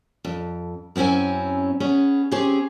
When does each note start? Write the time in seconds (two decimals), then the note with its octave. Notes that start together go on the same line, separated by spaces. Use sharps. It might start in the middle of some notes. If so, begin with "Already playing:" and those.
0.25 F2
0.96 F#2 C4 C#4 E4 G#5
1.80 B3 C#4 G#4
2.31 C4 C#4 G4 G#4